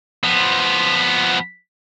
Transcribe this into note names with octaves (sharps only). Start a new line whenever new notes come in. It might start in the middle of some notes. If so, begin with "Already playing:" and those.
F3 B3